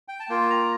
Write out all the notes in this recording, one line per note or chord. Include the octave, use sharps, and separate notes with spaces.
G5
A5
A#3 F4 G5
A#5